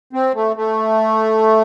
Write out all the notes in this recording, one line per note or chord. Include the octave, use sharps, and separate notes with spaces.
C4
A3
A3